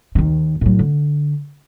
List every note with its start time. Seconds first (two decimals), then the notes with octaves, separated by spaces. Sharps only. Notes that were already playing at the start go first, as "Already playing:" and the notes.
0.15 D#2 D#3
0.61 A2 F#3
0.79 D3